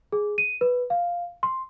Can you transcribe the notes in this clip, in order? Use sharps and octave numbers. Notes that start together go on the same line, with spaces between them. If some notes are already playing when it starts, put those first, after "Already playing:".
G#4
D#7
B4
F5
C6